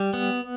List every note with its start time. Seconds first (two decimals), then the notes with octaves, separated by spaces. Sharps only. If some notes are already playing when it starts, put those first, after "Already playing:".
Already playing: G3
0.14 B3